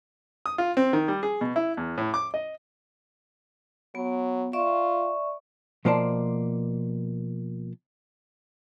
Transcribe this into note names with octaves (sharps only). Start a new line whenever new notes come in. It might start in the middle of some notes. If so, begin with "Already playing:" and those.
D#6
F4
C4
D#3
G3
G#4
B2
E4
E2
A2
D6
D#5
F#3 B3
F4 D5 E5 C#6
B2 F3 A#3 C5 D5 A5